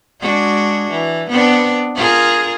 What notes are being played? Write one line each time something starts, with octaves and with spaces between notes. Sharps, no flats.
G#3 D4 F#4
E3
B3 C4 D4
F4 G#4 A#4